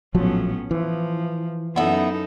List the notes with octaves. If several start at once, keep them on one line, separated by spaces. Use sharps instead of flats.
A#1 A2 F3 F#3 B3 C#4
E3 F3
F#2 B3 D#4 E4 A4